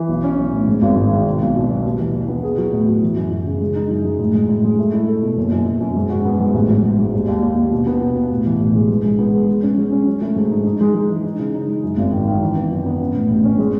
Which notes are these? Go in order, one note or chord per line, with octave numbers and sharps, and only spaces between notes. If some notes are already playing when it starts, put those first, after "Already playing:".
Already playing: E3
B1
C#4
B1
A2
G#2
G#1
G#2
D#3
B2
B1
B2
B1
D#2
E3
E3
B3
G#4
F#3
A2
F#3
E3
F#2
F#2
C#3
G#3
D#4
F#2
G#3
A2
G#3
A2
G#3
A3
E4
A4
B2
F#1
F#2
F#2
F#2
G#2
F#4
B3
G#2
A1
F#3
G#2
G#2
D#2
D#2
D#2
D#2
B2
B3
B2
B2
A2
E3
A1
G#3
G#2
G#3
B3
G#3
G#3
C#4
G#3
C#4
F#3
A3
G#2
D#4
D#4
G#3
G#3
E3
D#4
C#3
D#4
G#3
F#2
G#1
D#3
D#3
E3
B3
F#2
B3
C#4
A2
A1
C#4
G#3